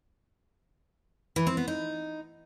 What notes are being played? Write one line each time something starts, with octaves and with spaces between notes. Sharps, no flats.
E3
C4
B3
D#4